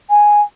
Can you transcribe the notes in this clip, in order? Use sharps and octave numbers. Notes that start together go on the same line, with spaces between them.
G#5